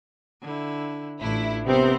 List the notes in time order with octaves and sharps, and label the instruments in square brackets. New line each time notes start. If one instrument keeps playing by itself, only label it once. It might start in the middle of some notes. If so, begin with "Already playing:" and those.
[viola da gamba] D3 E4
[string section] A1 E4 [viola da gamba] A3 D4 F4
[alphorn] C3 [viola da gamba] G3 A#4 [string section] B3 C4 C5